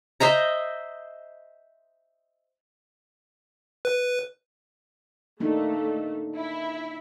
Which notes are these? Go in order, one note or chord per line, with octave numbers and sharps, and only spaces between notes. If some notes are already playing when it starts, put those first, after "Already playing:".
C5 D#5 E5 A#5
B4
A3 A#3 D4 D#4
E4